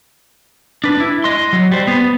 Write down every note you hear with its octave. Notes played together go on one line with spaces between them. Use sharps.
D4 B4
E4
D#5 C6
F#3
G3 C5
B3